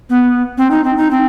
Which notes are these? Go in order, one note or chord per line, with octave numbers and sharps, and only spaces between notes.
B3
C4
D#4
C4
D#4
C4